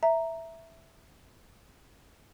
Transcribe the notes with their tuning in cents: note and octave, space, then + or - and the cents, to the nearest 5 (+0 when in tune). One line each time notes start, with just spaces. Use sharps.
E5 +0 A#5 -5